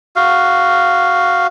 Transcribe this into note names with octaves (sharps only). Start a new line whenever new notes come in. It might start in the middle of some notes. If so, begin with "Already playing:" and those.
F#4 F5